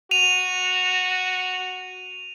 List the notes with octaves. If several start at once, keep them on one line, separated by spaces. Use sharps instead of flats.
F#4 D#7 F7